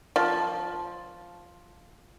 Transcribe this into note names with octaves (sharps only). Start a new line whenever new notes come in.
F3